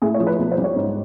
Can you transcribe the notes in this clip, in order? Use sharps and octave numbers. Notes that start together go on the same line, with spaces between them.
A2 G#4
C#5
F3
B4
B1
C5
G3
C#5
G#2